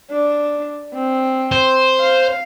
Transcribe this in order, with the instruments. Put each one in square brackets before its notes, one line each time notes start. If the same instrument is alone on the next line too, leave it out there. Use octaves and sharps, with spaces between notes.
[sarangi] D4
C4
[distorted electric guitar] C5
[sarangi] F5